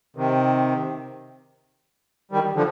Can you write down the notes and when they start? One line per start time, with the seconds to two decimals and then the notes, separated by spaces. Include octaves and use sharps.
0.16 C3 D#3
2.31 D#3 G3
2.55 D3 F3